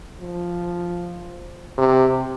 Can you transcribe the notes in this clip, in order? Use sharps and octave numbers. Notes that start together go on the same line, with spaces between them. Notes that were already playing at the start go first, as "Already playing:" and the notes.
F3
C3